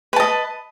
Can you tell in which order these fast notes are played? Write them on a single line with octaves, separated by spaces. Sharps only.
B4 A5 D#5